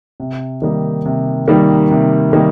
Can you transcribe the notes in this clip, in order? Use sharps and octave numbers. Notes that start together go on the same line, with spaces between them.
C3
D#3 G3 A#3 D#4
C3
D#3 G3 A#3 D#4
C3
D#3 G3 A#3 D#4